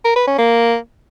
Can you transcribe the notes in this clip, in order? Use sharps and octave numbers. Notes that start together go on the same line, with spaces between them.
A#4
B4
C#4
A#3